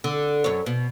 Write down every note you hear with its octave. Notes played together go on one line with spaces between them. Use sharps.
D3
F#2 C#5
B2